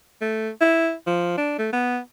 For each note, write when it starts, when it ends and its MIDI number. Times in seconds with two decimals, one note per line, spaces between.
0.21 0.49 57
0.61 0.93 64
1.07 1.35 53
1.37 1.54 62
1.58 1.68 57
1.73 1.99 59